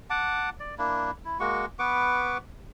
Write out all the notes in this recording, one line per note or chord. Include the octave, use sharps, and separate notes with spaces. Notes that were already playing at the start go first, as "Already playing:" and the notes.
F#5 A5 D6
D5
A#3 D4 E4
E4
G#3 A#3 F#4 C#6
B3 B4 C#6 D6